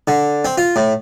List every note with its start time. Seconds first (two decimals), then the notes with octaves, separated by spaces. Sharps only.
0.08 D3
0.45 C4
0.58 F4
0.76 A2